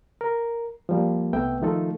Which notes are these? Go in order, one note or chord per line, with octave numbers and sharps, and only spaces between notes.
A#4
F3 G3 A#3
C2 A3 B3 E5 G5
D#3 F3 A3 D#4 F4 A4